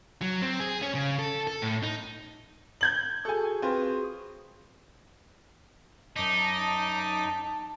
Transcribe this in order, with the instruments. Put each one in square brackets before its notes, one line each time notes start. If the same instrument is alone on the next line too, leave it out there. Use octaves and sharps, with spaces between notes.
[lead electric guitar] F#3
C4
G#4
C#4
C#3
A4
A4
A2
D#4
[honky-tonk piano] G6 G#6 F#7
[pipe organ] F#4 G#4 [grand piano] A4 G#5
[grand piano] C4 F4 B4
[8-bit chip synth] F#2 D6 B6 [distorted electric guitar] D#4 [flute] A5